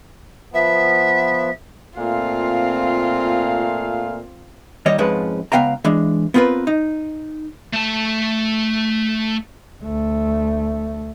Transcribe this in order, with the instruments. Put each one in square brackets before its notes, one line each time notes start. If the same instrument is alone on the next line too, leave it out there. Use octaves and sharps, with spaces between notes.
[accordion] F3 B3 [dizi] E5
[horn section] A#2 A3 F5 [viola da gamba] C4 F4
[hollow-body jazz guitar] D#2 G3 C#5 D#5
F2 G#2 F3 G#3 C#4 B4
C#2 B3 F5 G5 A#5
E3 G#3 D4
B3 C4 F4 A#4 B4
D#4
[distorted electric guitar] A3 A5
[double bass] D2 A3